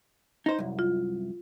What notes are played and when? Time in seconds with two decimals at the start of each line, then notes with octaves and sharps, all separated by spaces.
0.46 D#4 C5
0.59 C2 F#2
0.79 F4